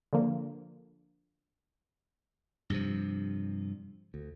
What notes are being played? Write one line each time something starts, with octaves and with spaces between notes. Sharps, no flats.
D3 F3 A#3
G2 C3 F3
D2